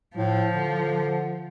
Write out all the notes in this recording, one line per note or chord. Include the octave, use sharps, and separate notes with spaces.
A2 F3
D3